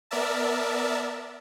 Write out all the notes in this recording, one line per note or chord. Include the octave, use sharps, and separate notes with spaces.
B3 A#4 D5 E5 A5